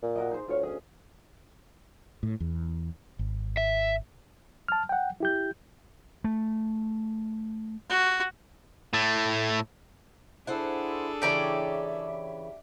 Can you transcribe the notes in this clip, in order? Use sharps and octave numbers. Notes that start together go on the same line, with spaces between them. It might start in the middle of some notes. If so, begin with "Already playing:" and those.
A#2
F#4 A#4 D#5
D#4 G#4 C5
D2 F4 C#5 F5
C#4 G#4
A2
E2
G#1
E5
A5 F6
F#5 G5
E4 G4 G6
A3
F#4
A2 A3
D4 E4 G#4 A4 C5 F#5
C#3 E3 G4 C#5 D5 E5 A#5